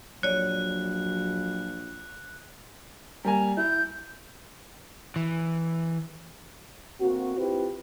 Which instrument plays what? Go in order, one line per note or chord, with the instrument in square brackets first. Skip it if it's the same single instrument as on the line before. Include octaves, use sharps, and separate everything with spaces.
[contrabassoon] A#1 [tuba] F#3 [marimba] C#5 D5 [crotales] F#6
[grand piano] G3 A#3 G#5 [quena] A#5
[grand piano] E4 [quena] G6
[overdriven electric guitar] E3
[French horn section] D2 A#3 C4 F#4
C4 E4 F4 G4 B4 C5